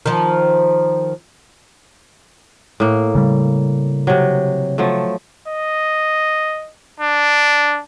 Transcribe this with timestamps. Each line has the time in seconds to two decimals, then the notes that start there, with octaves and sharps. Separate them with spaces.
0.06 D#3 F3
2.80 A2 A#3
3.15 C#3 G3
4.07 C3 F#3
4.78 F3 F#3 A3
5.48 D#5
7.00 D4